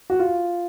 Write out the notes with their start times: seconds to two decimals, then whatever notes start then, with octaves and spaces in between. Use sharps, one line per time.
0.10 F#4
0.20 F4